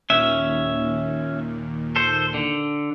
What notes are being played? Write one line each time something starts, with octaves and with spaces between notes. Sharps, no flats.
D#2 A#2 D#3 C#4 E5
A4 C5
D3